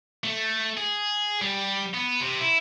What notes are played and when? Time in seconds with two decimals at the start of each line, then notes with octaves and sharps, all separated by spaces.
0.24 A3
0.77 G#4
1.42 G3
1.93 B3
2.21 C3
2.40 E4